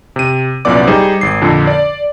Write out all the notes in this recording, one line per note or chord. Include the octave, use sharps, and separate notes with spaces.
C3 D#7
C2 F#2 A#2 B3 D5 D6
G3 D#4 G#4 C5
G#1 C7
F2 A#2 D3
D5